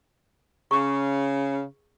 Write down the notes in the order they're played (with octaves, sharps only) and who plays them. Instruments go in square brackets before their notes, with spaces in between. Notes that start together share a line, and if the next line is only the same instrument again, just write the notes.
[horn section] C#3 [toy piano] G#4 A#5 C#6